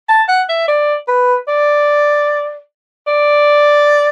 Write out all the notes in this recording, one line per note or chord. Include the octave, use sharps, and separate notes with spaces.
A5
F#5
E5
D5
B4
D5
D5